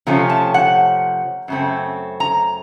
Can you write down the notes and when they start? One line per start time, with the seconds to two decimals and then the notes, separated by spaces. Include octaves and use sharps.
0.07 C3 F3 A3 C#4
0.29 A5
0.54 F#5
1.48 F#2 C#3 A3 C4
2.20 A#5